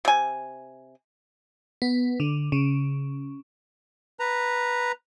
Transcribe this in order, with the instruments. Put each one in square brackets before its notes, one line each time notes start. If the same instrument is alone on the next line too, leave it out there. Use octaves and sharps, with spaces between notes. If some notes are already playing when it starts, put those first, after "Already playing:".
[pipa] C3 G#5
[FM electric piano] B3
D3
C#3
[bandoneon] B4 A#5